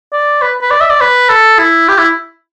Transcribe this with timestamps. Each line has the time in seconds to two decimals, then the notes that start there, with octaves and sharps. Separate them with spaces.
0.13 D5
0.42 B4
0.61 B4
0.71 D5
0.81 E5
0.90 D5
1.01 B4
1.29 A4
1.59 E4
1.88 G4
1.98 E4